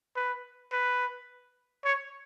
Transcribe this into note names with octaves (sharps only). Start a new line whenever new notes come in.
B4
B4
C#5